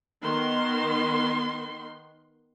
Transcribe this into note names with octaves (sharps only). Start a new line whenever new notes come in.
D#3 B3 C6